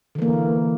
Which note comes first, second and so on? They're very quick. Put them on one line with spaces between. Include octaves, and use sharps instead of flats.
D3 E3 A#3